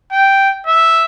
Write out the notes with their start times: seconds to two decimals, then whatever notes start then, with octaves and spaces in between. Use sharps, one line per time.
0.12 G5
0.67 E5